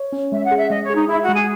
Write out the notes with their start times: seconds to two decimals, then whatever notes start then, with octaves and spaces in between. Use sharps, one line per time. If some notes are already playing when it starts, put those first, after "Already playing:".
Already playing: C#5
0.12 C#4
0.32 G#3 E5
0.45 F#5
0.51 G#4
0.57 E5
0.70 G#3 D#5
0.84 C#5
0.90 G#4
0.96 D#4
1.09 E4 G#4
1.22 F#4
1.28 G#3
1.35 G#4